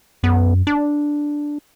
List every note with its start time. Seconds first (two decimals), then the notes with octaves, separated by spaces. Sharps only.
0.23 F#2 B3
0.67 D4